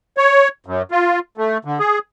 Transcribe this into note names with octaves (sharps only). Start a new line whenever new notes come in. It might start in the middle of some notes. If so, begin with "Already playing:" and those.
C#5
F#2
F4
A3
D3
G#4